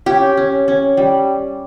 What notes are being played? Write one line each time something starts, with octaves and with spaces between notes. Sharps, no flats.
C#4 G4
C#4
C#4
G3